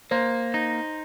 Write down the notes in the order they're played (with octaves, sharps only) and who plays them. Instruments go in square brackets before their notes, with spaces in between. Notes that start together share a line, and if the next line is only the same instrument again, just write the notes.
[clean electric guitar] A#3 [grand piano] C5
[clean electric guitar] D#4